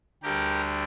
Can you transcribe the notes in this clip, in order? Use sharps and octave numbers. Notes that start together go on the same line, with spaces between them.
D2 D3 G3 G4 A#4